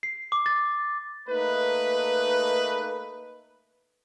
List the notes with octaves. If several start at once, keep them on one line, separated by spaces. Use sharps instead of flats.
C7
D6
A6
A3 A#3 D#4 B4